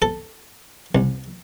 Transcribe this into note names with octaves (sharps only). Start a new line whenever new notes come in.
A4
C2